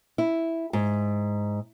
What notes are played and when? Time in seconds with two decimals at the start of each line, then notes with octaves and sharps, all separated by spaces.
0.18 E4
0.73 G#2